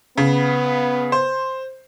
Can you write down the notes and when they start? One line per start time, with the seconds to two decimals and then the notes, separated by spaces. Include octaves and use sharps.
0.18 C#3 B3
1.12 C5